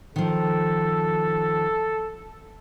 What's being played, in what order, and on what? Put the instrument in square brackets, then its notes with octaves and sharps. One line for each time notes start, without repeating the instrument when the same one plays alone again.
[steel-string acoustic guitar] D#3 F3 [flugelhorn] A4